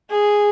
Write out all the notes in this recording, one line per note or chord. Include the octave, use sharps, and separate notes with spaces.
G#4